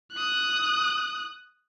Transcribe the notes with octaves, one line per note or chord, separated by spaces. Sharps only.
D#6 F#6